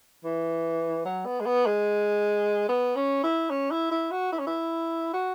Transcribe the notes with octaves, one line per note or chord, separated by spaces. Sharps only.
E3
F#3
B3
G#3
B3
G#3
B3
C#4
E4
C#4
E4
E4
F#4
E4
C#4
E4
F#4